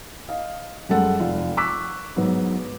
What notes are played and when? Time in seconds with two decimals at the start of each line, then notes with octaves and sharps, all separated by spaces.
0.28 D#5 F5
0.89 F#2 G3 G#3 A4 F#5
1.19 F1 F4 F5
1.57 C#6 D6 E6 F#6 B6
2.16 G#2 F#3 B3